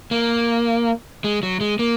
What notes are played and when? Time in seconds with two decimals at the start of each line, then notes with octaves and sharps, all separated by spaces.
0.11 A#3
1.24 G#3
1.43 F#3
1.61 G#3
1.79 A#3